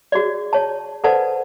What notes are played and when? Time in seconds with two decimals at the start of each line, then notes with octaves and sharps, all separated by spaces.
0.12 F#4 G#4 C#5 D5
0.53 C#5 A5
1.04 A4 B4 C5 D5 F#5 A5